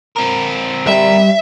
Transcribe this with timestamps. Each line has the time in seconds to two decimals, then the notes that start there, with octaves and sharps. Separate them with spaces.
0.17 C4 A#4
0.87 G3 E5